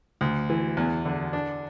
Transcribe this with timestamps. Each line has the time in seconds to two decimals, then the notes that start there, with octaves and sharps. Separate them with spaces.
0.21 D2
0.50 E3
0.77 E2
1.05 D3
1.33 D4